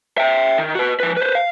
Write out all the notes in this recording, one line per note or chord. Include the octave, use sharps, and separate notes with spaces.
E5 G5
D#3
F#4 B4
F3 B4
B4 C5
F5